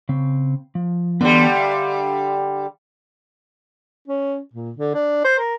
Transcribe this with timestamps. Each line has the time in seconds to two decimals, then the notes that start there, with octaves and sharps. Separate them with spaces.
0.09 C#3 C4
0.75 F3
1.21 D3 E3 F#3 G3 B3
1.57 E5 F5
4.08 C#4
4.53 A#2
4.76 D3
4.94 D4
5.24 C5
5.39 A#4